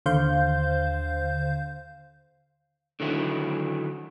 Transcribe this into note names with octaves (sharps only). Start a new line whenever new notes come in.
D#2 D3 C5 F5 G6
D3 D#3 F#3 E4